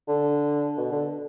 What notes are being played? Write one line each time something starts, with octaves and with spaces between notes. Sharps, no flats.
D3
B2
D3